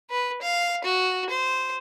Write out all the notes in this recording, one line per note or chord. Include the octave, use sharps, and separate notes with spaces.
B4
F5
F#4
C5